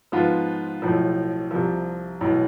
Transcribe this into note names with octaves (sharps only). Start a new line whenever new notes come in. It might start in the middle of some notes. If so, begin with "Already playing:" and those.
G#2 F3 B3 F4
B1 A2 F3
C2 C3 F3
B1 A2 E3